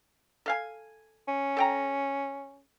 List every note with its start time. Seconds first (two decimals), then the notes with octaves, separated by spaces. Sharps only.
0.46 A4 F5 G#5
1.28 C#4
1.57 A4 G5 A#5